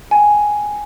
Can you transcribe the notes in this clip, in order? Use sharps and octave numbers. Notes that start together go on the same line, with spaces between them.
G5 G#5